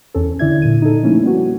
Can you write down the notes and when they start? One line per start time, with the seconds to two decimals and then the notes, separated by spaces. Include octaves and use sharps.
0.15 E2 C#4 A4
0.39 D3 E4 D5 E5 G#6
0.62 A#2 D3 D#7
0.82 D#4 A4
1.03 F3 A3 A#3 C#4 D#4 E4
1.23 G3 A#3 B3 F#4